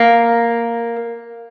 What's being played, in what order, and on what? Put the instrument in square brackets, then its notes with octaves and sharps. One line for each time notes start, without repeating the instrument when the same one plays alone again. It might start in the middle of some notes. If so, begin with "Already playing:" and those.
Already playing: [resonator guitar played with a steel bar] A#3